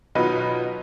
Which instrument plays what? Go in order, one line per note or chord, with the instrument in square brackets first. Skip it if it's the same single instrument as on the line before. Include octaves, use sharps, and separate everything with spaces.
[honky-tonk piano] B2 F#3 D#4 F4 B4